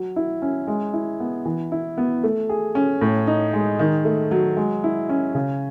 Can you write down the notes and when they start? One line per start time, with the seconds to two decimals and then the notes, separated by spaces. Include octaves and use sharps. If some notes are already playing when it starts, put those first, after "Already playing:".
Already playing: F#3
0.16 E4
0.42 C#4
0.67 G#3
0.93 E4
1.20 B3
1.45 E3
1.72 E4
1.98 B3
2.24 A3
2.49 G#4
2.75 C#4
3.01 A2
3.27 D#4
3.53 G#3
3.79 D#3
4.05 A3
4.31 F#3
4.57 G#3
4.84 E4
5.09 C#4
5.35 C#3